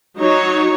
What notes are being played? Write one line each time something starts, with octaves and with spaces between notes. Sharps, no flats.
F#3 D#4 F#4 C#5